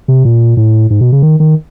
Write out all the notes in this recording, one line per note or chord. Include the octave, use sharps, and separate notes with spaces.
C3
A#2
A2
G#2
B2
C#3
D#3
D#3